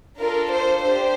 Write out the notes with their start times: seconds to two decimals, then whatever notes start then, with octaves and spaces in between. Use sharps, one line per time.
0.18 D4 F4 A4 A#4
0.50 C5
0.82 D4 G4 C5